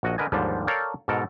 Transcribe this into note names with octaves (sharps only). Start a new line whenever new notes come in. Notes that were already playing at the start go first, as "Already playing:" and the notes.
A#1 F#4 D#5
D3 A#4 B4 D#5 G#5
D#2 G#2 D3 F3 G3
A4 A#4 C#5 D5 F5 G5
G#2 B2 A4 A#4